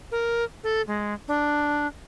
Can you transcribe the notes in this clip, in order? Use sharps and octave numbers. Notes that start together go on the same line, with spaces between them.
A#4
A4
G#3
D4